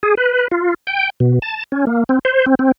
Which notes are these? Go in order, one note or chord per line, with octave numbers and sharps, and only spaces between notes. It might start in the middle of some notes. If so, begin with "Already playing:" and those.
G#4
B4
F4
G5
B2
A5
C#4
A#3
C4
C5
C4
C4